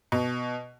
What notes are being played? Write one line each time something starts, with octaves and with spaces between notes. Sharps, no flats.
B2